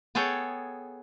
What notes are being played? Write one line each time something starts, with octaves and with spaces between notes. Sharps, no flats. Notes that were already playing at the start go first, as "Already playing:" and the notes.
B3 G#4 A4 C#5 G5 A5